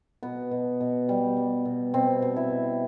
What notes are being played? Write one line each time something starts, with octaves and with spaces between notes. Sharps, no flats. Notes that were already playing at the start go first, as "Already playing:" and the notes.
B2 B3
B2
B2
G3
G3
B2
B2 C4
B2
E4
B2